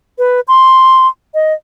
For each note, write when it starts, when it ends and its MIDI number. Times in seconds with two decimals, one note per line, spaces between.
0.18 0.40 71
0.48 1.07 84
1.34 1.53 75